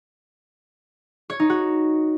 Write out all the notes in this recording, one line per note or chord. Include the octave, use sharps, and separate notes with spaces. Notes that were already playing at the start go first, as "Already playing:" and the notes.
C#5
D#4
F#4